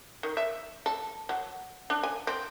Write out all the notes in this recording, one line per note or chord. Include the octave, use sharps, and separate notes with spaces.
D#3
E5
A4
F#3
D4
G#5
C4